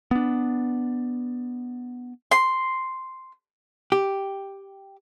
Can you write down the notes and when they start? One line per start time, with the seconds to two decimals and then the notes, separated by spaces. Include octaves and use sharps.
0.11 B3 D4
2.31 C6
3.92 G4